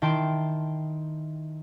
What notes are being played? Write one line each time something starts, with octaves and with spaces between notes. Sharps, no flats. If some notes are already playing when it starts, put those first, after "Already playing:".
D#3 E4 G5 A5 C6 D7